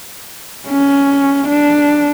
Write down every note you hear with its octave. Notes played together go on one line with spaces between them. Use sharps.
C#4
D4